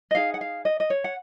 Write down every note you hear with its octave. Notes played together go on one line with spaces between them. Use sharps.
D#5
D#4 G#4 F5
F#5
F5
D#5
D#5
C#5
F#5